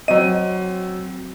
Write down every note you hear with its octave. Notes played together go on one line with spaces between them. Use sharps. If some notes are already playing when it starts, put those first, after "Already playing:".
F#3 C4 D#5 A#5 D#7